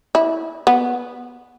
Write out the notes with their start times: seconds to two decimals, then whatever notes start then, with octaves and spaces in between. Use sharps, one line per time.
0.15 E4
0.67 B3